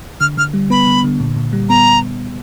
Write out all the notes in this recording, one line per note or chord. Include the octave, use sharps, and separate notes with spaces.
D3 F6
D3 F6
G3
B3 B5
D3
D3
A#2
A#2
G3
B3 A#5